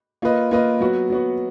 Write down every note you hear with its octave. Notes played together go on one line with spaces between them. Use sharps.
A#3 F4 B4 D#5
A#3 F4 B4 D#5
F#3 B3 F#4
F#3 B3 F#4